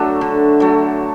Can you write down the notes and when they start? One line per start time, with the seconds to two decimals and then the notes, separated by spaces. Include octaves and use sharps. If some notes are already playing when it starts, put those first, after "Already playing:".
Already playing: F#3 A3 D4 F#4 A4
0.21 D3
0.60 F#3 A3